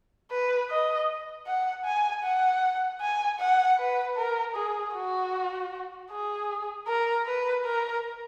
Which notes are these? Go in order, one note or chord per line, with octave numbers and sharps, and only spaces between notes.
B4
D#5
F#5
G#5
F#5
G#5
F#5
B4
A#4
G#4
F#4
G#4
A#4
B4
A#4